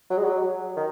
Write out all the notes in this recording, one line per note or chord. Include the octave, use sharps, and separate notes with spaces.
F#3
G#3
F#3
D#3